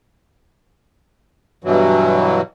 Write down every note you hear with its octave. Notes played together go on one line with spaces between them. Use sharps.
G2 B2 E3 F#3